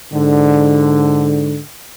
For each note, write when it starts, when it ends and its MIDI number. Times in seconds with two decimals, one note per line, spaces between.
0.13 1.59 44
0.13 1.59 50